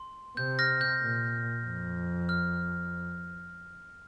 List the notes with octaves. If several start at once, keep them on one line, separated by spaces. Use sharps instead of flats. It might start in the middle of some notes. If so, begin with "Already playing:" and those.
Already playing: C6
C3 G6
F6 A#6
G6
A#2
F2
F6